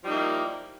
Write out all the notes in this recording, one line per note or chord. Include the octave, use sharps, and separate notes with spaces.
F3 G3 A#3 D#4 E4